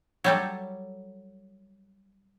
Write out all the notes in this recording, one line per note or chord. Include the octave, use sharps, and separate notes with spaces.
F#3 G3 A4